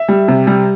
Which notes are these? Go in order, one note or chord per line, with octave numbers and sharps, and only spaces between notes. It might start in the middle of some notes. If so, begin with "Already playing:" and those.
Already playing: E5
G3
C3
G3